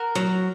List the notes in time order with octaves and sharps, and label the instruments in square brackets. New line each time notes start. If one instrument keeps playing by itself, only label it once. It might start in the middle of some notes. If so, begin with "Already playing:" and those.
Already playing: [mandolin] F#4 A#4
[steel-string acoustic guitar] F#3